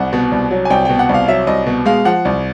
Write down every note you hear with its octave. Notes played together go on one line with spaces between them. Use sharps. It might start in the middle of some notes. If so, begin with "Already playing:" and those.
Already playing: C2 F#5
B2
C2
F#3
G#5
C2 G5
B2 G5
F#5
C2
F5
F#3 E5
C2 D#5
B2
G#3 F5
F3 F#5
C2